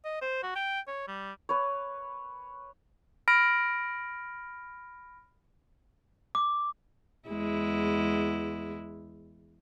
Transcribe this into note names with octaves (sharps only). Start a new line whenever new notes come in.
D#5
C5
F#4
G5
C#5
G3
B4 C#5
B5 F6 A#6 D7
D6
E2 G#3 E4